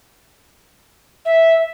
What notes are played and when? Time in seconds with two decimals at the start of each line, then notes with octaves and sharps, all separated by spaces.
1.25 E5